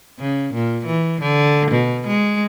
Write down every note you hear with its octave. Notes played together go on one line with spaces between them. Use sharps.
C#3
A#2
E3
D3
B2
G#3